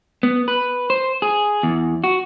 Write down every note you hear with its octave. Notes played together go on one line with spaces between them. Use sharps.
B3
B4
C5
G#4
E2
F#4